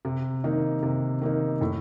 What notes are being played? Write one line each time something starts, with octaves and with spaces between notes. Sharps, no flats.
C3
D#3 A#3 D#4
C3
D#3 A#3 D#4
A2